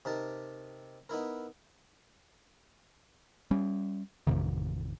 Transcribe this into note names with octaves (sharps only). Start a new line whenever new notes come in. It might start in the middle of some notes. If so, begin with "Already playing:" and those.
C3 D#4 A#4 A5
B3 D#4 E4 A#4
G3 C#4
A1 F2 C3 D#3